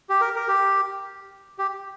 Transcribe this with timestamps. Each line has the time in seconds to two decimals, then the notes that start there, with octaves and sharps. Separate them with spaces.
0.10 G4
0.21 A#4
0.36 A#4
0.48 G4
1.59 G4